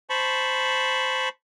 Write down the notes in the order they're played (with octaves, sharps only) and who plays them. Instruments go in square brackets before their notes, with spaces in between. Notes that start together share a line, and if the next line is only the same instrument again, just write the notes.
[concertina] C5 A5 B5 C#6